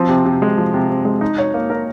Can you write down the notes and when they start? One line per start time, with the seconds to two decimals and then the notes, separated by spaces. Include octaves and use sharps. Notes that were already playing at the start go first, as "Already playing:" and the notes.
Already playing: F3 C4
0.09 C3
0.25 C3
0.42 G#3
0.58 F3
0.74 C3
0.90 C3
1.05 G#3
1.21 D#4
1.38 C#5
1.54 A#3
1.70 A#4